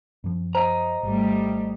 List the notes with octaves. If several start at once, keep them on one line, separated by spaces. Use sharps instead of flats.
F#2 F3
C5 D#5 A#5
G#1 G3 A3